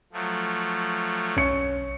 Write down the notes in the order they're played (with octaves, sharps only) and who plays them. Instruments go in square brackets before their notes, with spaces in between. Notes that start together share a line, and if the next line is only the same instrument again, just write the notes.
[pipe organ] F3 F#3 A3
[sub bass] B1 [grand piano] C#4 C#7